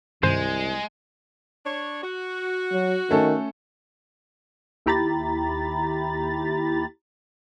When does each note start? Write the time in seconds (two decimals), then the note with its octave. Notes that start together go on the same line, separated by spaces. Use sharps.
0.23 C2 G2 C3 D#3 G#3 C5
1.66 D4 C#5
2.03 F#4
2.72 F#3
3.11 D#3 A3 C#4 A4
4.86 D#2 E4 G4 A#5 B5 A6